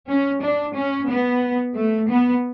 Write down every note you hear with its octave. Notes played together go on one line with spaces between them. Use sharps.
C#4
D4
C#4
B3
A3
B3